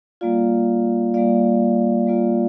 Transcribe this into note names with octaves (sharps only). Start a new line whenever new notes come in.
G3 A#3 F4 D5 F5
G3 A#3 F4 D5 F5
G3 A#3 F4